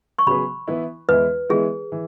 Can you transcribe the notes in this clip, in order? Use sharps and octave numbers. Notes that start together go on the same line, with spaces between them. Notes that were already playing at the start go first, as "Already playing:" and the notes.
C#6
C#3 F#3 B3 G#4 B4 B5
E3 B3 E4 B4
E2 E3 G#3 E4 B4
E3 G#3 B3 E4 G#4
E3